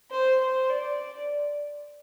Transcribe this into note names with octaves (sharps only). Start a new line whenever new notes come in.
C5
C5
D5